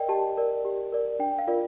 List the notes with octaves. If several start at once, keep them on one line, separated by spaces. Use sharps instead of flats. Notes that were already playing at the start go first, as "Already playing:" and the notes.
Already playing: A#4 D5 D#5 G5
G4 A5
A#4 D5
G4
A#4 D5
D4 G5
F5
F4 A#4 D5